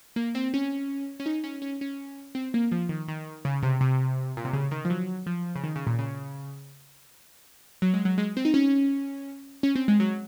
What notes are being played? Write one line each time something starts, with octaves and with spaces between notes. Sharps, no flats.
A#3
C4
C#4
C#4
D#4
C#4
C#4
C#4
C4
A#3
F3
D#3
D#3
C#3
C3
C3
A#2
C3
C#3
D#3
F3
F#3
F3
C#3
D#3
C#3
A#2
C#3
F#3
G#3
F#3
G#3
C4
D#4
C#4
C#4
C4
G#3
F#3